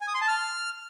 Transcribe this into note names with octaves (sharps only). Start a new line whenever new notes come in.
G#5
D#6
C6
A5
F6